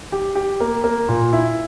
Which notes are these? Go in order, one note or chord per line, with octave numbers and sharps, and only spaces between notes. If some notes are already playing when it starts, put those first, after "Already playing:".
G4
G4
A#3
A#3
A#2
E4